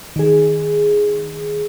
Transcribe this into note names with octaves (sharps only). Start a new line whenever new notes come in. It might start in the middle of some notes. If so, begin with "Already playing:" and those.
D#3 G#4